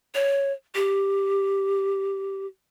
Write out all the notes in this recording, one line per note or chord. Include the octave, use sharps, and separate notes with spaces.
C#5
G4